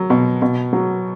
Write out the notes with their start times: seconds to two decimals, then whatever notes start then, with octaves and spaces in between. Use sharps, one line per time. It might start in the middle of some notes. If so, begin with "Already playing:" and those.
Already playing: F#3
0.10 B2
0.42 B2
0.73 F#3